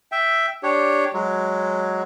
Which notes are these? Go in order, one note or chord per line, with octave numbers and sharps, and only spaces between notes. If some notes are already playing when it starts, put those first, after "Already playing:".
E5 G5
D4 G4 C#5
F#3 G#3